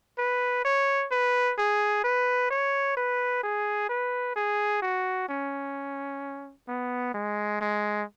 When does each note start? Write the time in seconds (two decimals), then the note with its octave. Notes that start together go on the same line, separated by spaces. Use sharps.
0.18 B4
0.65 C#5
1.11 B4
1.58 G#4
2.04 B4
2.51 C#5
2.97 B4
3.44 G#4
3.89 B4
4.36 G#4
4.82 F#4
5.29 C#4
6.68 B3
7.14 G#3
7.61 G#3